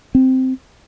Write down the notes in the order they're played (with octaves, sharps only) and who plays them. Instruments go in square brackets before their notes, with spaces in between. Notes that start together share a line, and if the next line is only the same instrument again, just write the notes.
[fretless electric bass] C4